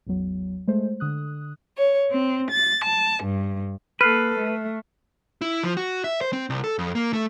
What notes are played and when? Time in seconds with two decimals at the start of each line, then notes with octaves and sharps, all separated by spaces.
0.07 A1 E2 F#3
0.68 G#3 A3 C5
1.00 D3 D#6 F#6
1.76 C#5
2.10 C4
2.51 A6
2.84 A5
3.24 G2
4.01 A#3 A4 B4 F6 F#6 C7
4.38 A3
5.41 E4
5.63 F3
5.77 F#4
6.04 E5
6.21 C5
6.33 C4
6.50 C2
6.64 A4
6.78 F2
6.95 A#3
7.13 A3